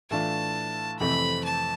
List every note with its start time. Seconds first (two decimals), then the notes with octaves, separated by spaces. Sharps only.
0.11 A2 E3 A3 D4 F4 A5
1.00 F2 C3 E3 A3 C4 B5
1.45 A5